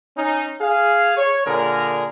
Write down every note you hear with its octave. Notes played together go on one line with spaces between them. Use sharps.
C#4 D#4
G#4 F5
C#5
A#2 D3 G#4 A#4